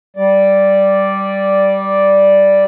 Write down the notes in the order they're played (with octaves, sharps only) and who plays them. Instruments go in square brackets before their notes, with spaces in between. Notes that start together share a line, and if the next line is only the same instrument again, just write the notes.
[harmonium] G3 D5